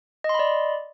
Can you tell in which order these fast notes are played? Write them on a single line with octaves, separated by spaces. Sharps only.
D#5 C6 B5 D5